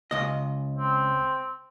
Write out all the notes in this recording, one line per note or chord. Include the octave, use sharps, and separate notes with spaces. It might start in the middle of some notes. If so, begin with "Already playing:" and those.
C#2 D#5
C4